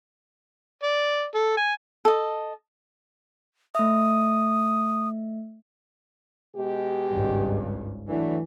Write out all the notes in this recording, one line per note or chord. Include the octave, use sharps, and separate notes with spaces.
D5
A4
G#5
A4 D#5
A3 E5 D#6
B2 G#3 G4
G#1 C#2 G2
E3 F#3 A3 D4